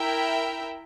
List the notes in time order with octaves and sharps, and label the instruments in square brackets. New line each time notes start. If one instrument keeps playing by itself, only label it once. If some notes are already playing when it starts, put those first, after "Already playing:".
Already playing: [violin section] E4 A#4 E5 G5